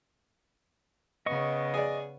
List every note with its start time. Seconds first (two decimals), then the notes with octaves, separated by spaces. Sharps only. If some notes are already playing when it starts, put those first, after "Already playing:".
1.26 C#3 B3 D#5 C#6
1.74 G#4 D5